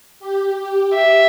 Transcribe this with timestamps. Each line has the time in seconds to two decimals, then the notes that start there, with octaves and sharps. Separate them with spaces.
0.20 G4
0.95 E5